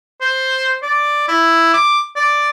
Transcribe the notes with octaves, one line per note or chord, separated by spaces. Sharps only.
C5
D5
E4
D6
D5